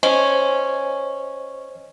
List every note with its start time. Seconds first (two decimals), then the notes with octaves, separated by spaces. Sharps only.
0.03 C#4 C5 D#5